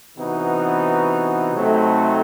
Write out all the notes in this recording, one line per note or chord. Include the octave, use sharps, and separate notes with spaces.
C3 E3 B3 D#4 F#4
C3 F#3 A3 C4 D#4